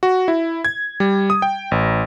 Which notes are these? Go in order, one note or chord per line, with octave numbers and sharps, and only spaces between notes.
F#4
E4
G#6
G3
D#6
G5
A1